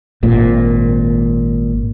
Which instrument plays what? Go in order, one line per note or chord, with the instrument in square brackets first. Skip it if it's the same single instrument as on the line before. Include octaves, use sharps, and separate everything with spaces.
[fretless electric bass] G#1 A#2